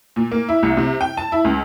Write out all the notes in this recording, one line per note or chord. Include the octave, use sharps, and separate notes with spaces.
A#2
A#3
E4
C2
C3
G5
A5
E4
C#2